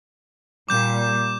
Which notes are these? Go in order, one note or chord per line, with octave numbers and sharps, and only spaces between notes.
A#2 G3 D6 G6 E7